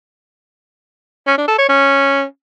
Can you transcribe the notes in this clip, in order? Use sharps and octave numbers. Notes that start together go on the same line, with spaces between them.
C#4
D4
A4
C#5
C#4